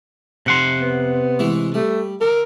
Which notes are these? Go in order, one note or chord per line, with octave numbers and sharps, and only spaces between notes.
F2 C3 F#5 C6
B3
E3 G#3 A3
G3 A3
D3 A#4